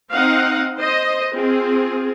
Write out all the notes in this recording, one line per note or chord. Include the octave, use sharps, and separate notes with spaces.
C4 D#4 F5 F#5
C5 D#5
C4 F4 G#4